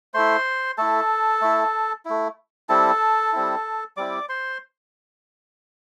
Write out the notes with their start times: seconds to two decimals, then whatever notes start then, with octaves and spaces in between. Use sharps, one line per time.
0.14 A3 E4 C5 C6
0.78 A3 E4 A4 A5
1.42 A3 E4
2.05 A3 E4
2.69 G3 C4 E4 A4 A5
3.33 G3 C4 E4
3.97 G3 C4 E4 D5 D6
4.29 C5 C6